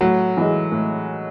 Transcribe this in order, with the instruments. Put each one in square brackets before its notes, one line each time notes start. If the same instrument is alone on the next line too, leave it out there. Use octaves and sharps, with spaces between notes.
[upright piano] A2 [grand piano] F#3
[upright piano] E3 G#3
A2